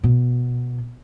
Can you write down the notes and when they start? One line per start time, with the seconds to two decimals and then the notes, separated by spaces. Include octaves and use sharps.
0.04 B2